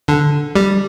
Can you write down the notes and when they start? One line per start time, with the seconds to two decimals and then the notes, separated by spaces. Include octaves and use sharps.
0.08 D3
0.55 G3